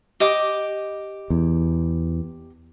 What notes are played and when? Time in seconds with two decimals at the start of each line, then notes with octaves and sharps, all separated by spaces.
0.20 G4 D#5 D6
1.30 E2